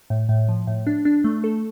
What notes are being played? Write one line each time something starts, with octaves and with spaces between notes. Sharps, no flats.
A2
A2
F3
A2
D4
D4
A3
A4